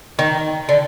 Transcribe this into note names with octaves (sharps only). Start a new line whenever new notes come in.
D#3
D3